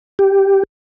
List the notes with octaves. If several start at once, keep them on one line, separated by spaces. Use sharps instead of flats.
G4